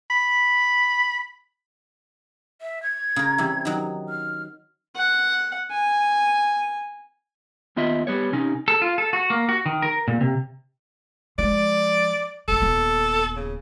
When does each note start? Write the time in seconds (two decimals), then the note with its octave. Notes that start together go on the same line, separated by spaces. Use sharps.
0.10 B5
2.62 E5
2.83 G#6
3.16 C#3 A#4
3.38 C3 E3 G3
3.65 D#3 F#3
4.09 F6
4.96 F#5
5.71 G#5
7.76 D#2 B3 F4 D#5 E5
8.07 G3 B3 C#5
8.32 C3 C#4 D#4
8.68 A4
8.82 F4
8.98 A4
9.13 F#4
9.30 A#3
9.49 F#4
9.66 D#3
9.82 A#4
10.08 A#2
10.21 C3
11.38 F3 G#3 D5
12.48 F1 E3 A4
12.62 D#1 B3
13.37 C#3